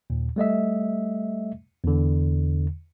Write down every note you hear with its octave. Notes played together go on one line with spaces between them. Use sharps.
D#2 A#2
G3 A3 D#5 E5
E2 D3